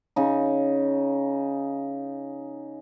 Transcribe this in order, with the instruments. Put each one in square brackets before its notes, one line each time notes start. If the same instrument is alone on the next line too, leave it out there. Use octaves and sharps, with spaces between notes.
[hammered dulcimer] C#3 D#4